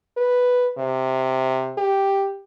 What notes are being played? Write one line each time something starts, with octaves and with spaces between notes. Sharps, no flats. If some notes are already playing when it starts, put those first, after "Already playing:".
B4
C3
G4